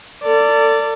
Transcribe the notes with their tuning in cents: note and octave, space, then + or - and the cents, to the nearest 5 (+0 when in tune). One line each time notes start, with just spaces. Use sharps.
A4 +40 D5 -10